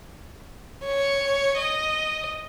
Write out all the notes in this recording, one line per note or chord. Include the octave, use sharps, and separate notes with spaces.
C#5
D#5